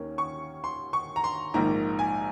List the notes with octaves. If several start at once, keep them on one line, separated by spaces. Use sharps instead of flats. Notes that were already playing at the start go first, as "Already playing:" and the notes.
Already playing: D#2 D#3 A#3 C#4
C#6
C6
C#6
A#5
C6
A#1 G#2 D#3 A#3 A#5
G#5